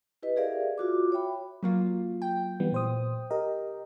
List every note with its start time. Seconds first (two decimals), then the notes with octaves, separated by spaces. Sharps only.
0.23 E4 G4 B4 D#5
0.36 G4 G#4 A#4 D5 E5 F5
0.78 F4 F#4 D6
1.12 C#5 E5 G5 B5
1.63 F#3 A#3 F4
2.22 G5
2.60 E3 G3 B3
2.72 A#2 C5 D#6
3.31 G4 A#4 D#5